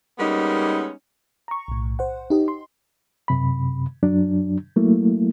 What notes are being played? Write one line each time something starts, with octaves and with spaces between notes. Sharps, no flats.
G3 G#3 A#3 B3 C#4 D#4
A#5 C#6
B1 A2
C5 F#5
D#4 G4 D#5
C6
F#2 C3 B5
F#2 F#3 D4
F#3 A3 A#3 E4